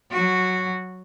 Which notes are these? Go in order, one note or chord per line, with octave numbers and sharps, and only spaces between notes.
F#3 F#4